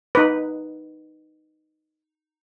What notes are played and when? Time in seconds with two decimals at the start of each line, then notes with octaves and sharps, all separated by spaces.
0.15 D#4 B4